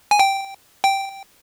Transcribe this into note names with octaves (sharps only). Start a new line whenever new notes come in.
G#5
G5
G5